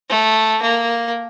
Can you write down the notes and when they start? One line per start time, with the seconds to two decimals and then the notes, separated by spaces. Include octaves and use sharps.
0.09 A3
0.61 A#3